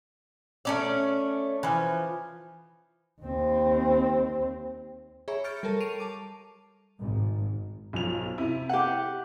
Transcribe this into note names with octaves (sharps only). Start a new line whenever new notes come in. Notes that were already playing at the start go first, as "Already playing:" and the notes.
A3 C#4 D5
E3 F3
D#2 C4
G#4 C#5 E5 A#5 B5 C#6
C#6 F6 G6 A6 C#7 D7
G3 A4 A#4 A5
C#6 C7 D7 D#7 F7
A5 D6
G#1 G#2
B1 F3 F7
C3 E4
G4 F#5